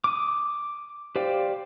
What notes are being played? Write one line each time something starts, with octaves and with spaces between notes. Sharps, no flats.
D6 D#6
G4 C5 D5 F5 G5